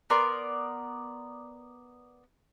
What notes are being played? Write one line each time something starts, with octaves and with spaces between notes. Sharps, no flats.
B3 A#4 D5 C6